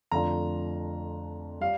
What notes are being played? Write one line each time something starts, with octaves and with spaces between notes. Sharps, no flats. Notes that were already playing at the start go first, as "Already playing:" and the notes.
F2 D3 A3 D4 F4 A#5
G3 F5